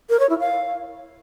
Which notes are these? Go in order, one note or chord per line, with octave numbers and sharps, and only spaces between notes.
A#4
C#5
E4
F5